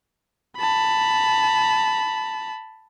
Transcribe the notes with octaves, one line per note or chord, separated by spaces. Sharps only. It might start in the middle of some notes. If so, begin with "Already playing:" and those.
A5 B5